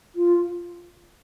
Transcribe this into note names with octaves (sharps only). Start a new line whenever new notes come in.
F4